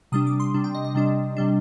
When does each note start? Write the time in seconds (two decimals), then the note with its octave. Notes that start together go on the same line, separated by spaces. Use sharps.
0.12 C3 G3 D4 D#6
0.27 D6
0.40 C6
0.54 C3 G3 D4
0.64 G5
0.75 D#5
0.85 D#5
0.95 C3 G3 D4
1.37 C3 G3 D4